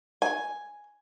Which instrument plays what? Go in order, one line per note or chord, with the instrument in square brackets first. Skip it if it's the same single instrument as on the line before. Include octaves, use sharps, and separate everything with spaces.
[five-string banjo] G#5